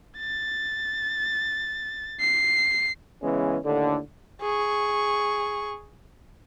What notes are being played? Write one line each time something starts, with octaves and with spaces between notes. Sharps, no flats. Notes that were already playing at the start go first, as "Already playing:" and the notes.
A6
C7
C#3 E3 G#3 B3 C#4
D#2 A2 D3
G#4 C#6